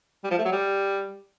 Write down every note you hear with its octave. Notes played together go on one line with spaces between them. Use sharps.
G3
F3
A3
F#3
G3